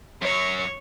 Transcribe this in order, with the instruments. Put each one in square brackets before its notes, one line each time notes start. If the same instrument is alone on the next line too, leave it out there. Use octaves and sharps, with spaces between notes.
[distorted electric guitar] F#2 F#3 [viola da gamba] C#5